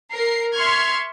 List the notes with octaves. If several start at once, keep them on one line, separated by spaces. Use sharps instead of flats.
A#4 C7
E5 C6 C#6 F6 G#6